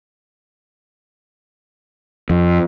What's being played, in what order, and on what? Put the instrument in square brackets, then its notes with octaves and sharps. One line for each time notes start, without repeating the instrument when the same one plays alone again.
[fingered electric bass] F2